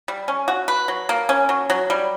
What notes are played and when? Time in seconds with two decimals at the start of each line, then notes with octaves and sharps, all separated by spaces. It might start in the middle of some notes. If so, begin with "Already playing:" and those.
0.08 G3
0.28 C#4
0.48 F#4
0.68 B4
0.88 F#3
1.09 A#3
1.29 C#4
1.49 F#3
1.70 F#3
1.90 G3